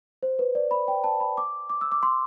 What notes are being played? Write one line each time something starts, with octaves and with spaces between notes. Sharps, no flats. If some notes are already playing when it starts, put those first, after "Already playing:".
C5
B4
D5
B5
G5
A5
B5
D6
D6
E6
D6
C6